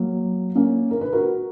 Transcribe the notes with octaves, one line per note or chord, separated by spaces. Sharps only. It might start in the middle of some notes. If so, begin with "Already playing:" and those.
Already playing: F#3 A#3
A#3 C#4
A#4
B4
F#4 A#4